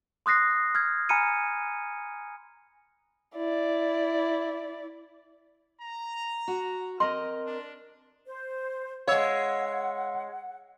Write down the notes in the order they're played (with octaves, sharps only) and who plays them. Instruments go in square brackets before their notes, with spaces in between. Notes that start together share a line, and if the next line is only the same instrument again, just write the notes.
[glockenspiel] C6 D#6 F#6 A#6 C7
F6 G#6
G#5 A#5 B5 F6 C#7 D#7
[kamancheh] E4 D5
[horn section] A#5
[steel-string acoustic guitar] F#4
[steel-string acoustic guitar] C4 A#4 D#5 [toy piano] C6
[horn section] D4
[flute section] C5
[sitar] G#3 C#5 [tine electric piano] F5 E6 [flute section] F#5